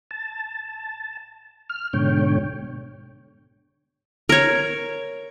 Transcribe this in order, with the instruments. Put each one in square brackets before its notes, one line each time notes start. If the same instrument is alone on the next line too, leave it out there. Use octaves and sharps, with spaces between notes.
[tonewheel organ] A5
F6
G#2 B2 D3 C#5 G5
[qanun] A#4 C#5